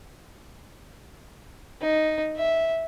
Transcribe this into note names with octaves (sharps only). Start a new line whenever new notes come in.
D#4
E5